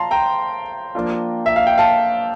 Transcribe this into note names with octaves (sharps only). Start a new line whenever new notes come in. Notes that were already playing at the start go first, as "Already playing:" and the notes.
Already playing: F3 F5 A5 A#5 C6
G5 A#5
F3 A#3 D4 F4
E5
F5
G5
F5 A5